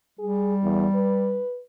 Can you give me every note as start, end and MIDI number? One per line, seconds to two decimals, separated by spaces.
0.19 1.41 55
0.19 0.54 68
0.64 0.86 40
0.95 1.61 71